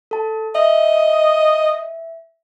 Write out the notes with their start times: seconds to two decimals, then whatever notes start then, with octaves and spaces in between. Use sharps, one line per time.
0.11 A4 A5
0.55 D#5 E5